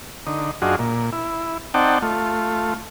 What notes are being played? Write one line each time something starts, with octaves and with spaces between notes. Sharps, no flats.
D3 D#4
F#2 D4 F4 F#4 G#4 D#5
A#2
E4
C4 D#4 D5 F#5 G5 A5
A3 F4